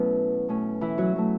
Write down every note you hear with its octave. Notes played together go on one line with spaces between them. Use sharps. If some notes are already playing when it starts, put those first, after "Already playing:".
Already playing: B2 F#3 A3 B3 C#4 E4
B2 A3 C#4
E3 E4
F#3 F#4
F#3 A3